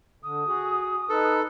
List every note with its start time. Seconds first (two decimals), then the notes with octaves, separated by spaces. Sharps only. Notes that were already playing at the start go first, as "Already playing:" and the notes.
0.23 D3 D#6
0.47 F#4 G#4
1.10 D#4 A4 B4